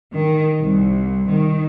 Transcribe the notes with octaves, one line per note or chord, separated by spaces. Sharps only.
D#3
C2
D#3